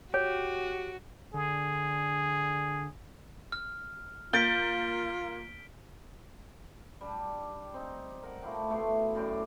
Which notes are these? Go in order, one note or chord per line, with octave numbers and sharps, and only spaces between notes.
F#4 G4 C#5
D3 G#4
F6
A#3 F4 G6 A6 B6 D7 G7
G3 D4 G4
C4 D#4
A#4 F#5
A3 E4 F4 G4
B2 A3 B3 C6
F#2 A2 G4 D5